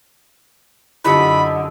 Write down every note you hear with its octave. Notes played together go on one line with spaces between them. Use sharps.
F#2 D3 E4 F4 G4 D#5 B5 D#6